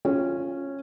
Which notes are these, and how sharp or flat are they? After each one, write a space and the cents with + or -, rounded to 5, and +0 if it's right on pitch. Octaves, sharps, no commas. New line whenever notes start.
C#4 -10 F4 +0